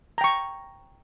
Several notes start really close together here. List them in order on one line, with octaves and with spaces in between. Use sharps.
A#5 G5 C#6